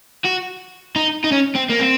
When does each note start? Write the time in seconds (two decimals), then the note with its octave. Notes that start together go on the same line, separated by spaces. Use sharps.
0.24 F#4
0.96 D#4
1.24 D#4
1.32 C#4
1.55 C4
1.70 A#3
1.80 C4